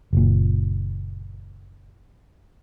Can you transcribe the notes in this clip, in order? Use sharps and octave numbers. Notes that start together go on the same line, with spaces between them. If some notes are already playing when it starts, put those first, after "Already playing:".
F#1 A#2